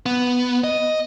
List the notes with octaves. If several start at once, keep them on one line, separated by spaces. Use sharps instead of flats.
B3
D#5